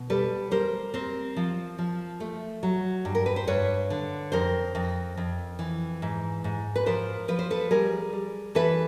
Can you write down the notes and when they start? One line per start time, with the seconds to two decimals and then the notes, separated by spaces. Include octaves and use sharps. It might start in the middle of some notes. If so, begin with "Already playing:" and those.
Already playing: B2
0.10 G3 A4 B4
0.51 G3 A#4 C5
0.94 C4 A#4 C5
1.36 F3
1.78 F3
2.20 A3
2.63 F#3
3.05 G2
3.15 A#4
3.26 B4
3.36 C5
3.47 G2 B4 C#5
3.90 D3
4.32 F2 A#4 C5
4.75 F2
5.17 F2
5.59 E3
6.02 G#2
6.44 G#2
6.76 B4
6.86 F3 A#4 C5
7.28 F3 B4
7.39 C5
7.50 A4 B4
7.71 G3 G#4 A#4
8.13 G3
8.55 E3 A4 B4